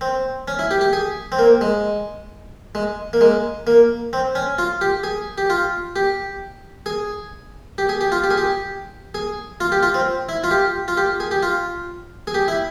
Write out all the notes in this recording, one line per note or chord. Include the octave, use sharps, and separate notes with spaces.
C4
C#4
E4
G4
G4
G#4
C4
A#3
G#3
G#3
A#3
G#3
A#3
C4
C#4
F4
G4
G#4
G4
F4
G4
G#4
G4
G#4
G4
F4
G4
G#4
G4
G#4
F4
G4
F4
C4
E4
F4
G4
F4
G4
G#4
G4
F4
G#4
G4
E4